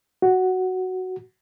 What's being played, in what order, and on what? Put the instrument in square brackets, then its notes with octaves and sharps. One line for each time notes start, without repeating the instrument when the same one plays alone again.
[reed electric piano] F#4